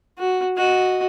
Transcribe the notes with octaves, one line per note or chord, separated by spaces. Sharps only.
F#4
F#4 D#5